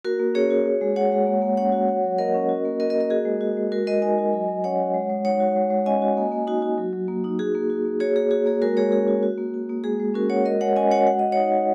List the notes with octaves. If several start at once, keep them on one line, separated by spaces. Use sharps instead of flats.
A#3 F#4 A#4
A#3
C#4 G#4 C#5
F#4
F#4
G#3
F#4 C#5 F#5
G#3
A#3
A#3
C#4 C#5 F#5
F#4
F#4
F#3
A#3 A#4 D#5
C#4
F#4
A#3
F#4 A#4 D#5
A#4 D#5
A#3
A#4 D#5
F#4 G#4
G#3
F#4
G#3
G#3 F#4 A#4
G#3 A#4 D#5
D#4 D#5 G#5
F#4
F#3
F#3
C#4 C#5 F#5
F#4
G#3
G#3
D#4 C#5 F#5
F#4
G#3
G#3
C#4 D#5 G#5
F#4
A#3
A#3
D#4 F#4
F#4
F#3
F#3
A#3
D#4
F#4 G#4
A#3
F#4
A#3
F#4 G#4 C#5
A#3 G#4
F#4 G#4
A#3 G#4
G#3 F#4 A#4
G#3 G#4 C#5
C#4 G#4
F#4
F#4
A#3
F#4
A#3
G#3 G#4
G#3
C#4 F#4 A#4
F#4 C#5 F#5
G#3 A#4 D#5
G#3 C#5 F#5
C#4 D#5 G#5
F#4 C#5 F#5
G#3 F#5
G#3 D#5
D#4 C#5 F#5
F#4